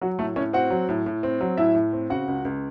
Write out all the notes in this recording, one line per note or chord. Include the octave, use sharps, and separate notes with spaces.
F#3 F#4
A2 A3 A4
A2 C#4 C#5
C4 F#4 F#5
F#3
A2
A2
C4
F#3
A2 E4 E5
A2
C4
C#3 F#4 F#5
C#2
C#2